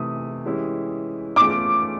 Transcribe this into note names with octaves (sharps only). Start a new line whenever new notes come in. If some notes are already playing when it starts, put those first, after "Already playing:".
Already playing: C3 E3 A3 D#6
E3 G#3 C#4 E4 G4
E3 A3 C#4 F4 D6